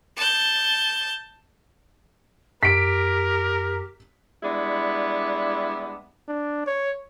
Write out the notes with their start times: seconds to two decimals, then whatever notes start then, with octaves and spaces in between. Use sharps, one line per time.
0.17 A5 G6
2.63 F#2 G4 A#4 B6 D7
4.43 G3 G#3 B3 D4 E4
6.28 D4
6.66 C#5